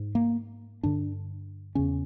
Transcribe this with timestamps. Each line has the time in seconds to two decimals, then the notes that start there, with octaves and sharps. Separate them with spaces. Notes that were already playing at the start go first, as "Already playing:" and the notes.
Already playing: G#2
0.15 A#3
0.83 G2 D3 D4
1.75 E2 C#3 C#4